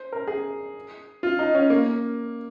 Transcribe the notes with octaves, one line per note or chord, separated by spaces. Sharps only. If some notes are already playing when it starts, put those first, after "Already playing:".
Already playing: C5
A#4
G#4
F4
D#4
C#4
A#3